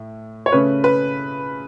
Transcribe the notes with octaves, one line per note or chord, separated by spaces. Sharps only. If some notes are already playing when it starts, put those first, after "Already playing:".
Already playing: A2
C#5
C#3 A3 C#4 B4
B4